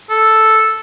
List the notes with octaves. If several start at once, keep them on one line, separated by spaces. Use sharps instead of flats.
A4